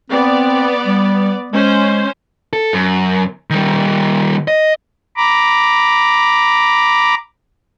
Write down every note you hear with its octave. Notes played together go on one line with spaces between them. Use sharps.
B3 C4 D5
G3
G#3 C#4 C5
A4
F#2
D#3 G3
D#5
A#5 B5 D6